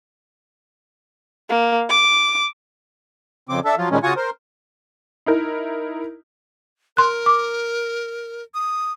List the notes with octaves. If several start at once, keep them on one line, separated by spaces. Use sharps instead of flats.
A#3
D6
F2 C#3 C4 D6
D4 A4 E5
F3 F#3 F4
A#2 D#3 G3 G#3 C#4
C#3 F4 F#4 G#5 C#6 D#6
A#4 C5
D#4 E4 A#4
A#4 C6 F#6
D6
D#6